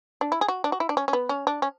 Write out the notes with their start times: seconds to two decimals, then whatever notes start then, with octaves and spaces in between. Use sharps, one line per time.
0.21 D4
0.32 E4
0.41 G#4
0.48 F#4
0.64 D4
0.72 F#4
0.80 E4
0.89 D4
0.97 C#4
1.08 C#4
1.13 B3
1.29 C#4
1.47 D4
1.62 C#4